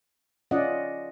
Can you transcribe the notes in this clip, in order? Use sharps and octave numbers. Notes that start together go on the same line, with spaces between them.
C#4 F4 D5 D#5 F#5